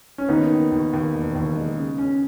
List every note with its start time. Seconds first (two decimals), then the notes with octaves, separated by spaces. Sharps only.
0.18 C#4
0.29 D#2 B3 D#4
0.50 D#3
0.72 D#2
0.93 D#2
1.14 E1
1.35 D#2
1.56 G#3
1.77 C#3
1.98 C#4